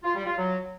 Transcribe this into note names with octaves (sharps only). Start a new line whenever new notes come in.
F4
G3
F4
F#3